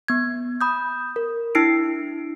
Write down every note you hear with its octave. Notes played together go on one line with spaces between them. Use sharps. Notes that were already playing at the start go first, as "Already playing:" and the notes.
B3 G#6
B5 D#6 G6
A#4
D4 E4 E6 C7 D7